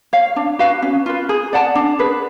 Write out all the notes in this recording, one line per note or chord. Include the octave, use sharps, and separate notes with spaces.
C#5 F5
D4
F#4 B4 F5
C#4
F4 B4
G#4
D5 F#5 A5
D4
G#4 B4